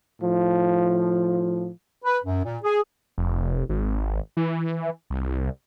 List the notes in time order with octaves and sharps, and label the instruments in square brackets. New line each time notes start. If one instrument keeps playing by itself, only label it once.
[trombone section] A2 F3
[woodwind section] B4
F#2
A#2
G#4
[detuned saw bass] F1
G#1
E3
C2